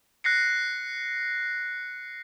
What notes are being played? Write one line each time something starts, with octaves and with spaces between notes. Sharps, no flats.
F#6 A#6 C7 C#7